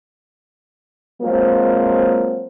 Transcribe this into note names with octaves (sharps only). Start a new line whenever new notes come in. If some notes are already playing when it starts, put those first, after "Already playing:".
F3 F#3 G#3 A#3 C4